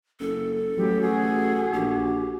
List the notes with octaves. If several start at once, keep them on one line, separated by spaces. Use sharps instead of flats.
F#1 A4
A1 F#3 G4
F#4 G#4
A#1 G4